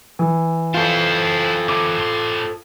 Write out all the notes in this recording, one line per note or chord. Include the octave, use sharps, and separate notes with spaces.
E3
E4 F4 A4 C5
D3 E3 D6
A2 C6